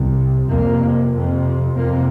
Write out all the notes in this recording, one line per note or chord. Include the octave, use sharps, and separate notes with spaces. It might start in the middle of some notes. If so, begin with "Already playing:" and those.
Already playing: C2 C3
F2 C3 A#3
F2 C3
F2 C3 A#3